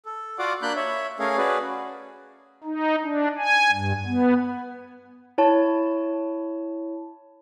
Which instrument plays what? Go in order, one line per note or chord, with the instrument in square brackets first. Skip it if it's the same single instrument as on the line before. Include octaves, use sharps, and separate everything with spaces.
[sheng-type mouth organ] A4
F4 F#4 D5 F5 F#5 D6
A#3 D4 D5 B5 F#6 G6
C#5 E5
A3 C#4 G#4 A#4 C#5 F5
C#4 F#4 G#4 B4 D5
[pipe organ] D#4
D4
G#5
G2
B3
[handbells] E4 C#5 A5